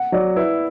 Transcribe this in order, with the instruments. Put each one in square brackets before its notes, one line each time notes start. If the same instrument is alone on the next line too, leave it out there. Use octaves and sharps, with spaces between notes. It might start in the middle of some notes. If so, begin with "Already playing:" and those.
Already playing: [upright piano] F#5
[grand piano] F#3 [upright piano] D5
[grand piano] E4 [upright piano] B4